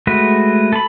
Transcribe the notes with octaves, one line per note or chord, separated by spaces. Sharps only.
G#3 A3 F#4 B4
A4 B5